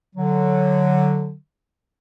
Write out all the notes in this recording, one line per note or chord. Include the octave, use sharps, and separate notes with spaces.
D3 F#3